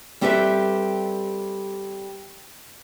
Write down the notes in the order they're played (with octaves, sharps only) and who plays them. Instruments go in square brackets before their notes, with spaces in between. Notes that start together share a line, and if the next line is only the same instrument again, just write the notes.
[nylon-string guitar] G3 C4 G4 A4 B4 E5